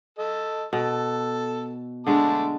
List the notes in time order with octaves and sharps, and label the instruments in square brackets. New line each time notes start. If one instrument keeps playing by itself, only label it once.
[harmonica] A4 D#5
[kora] B2 [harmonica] A4
[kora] D3 G#3 [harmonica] A3 A5 D6